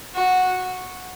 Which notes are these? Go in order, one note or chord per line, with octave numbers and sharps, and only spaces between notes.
F#4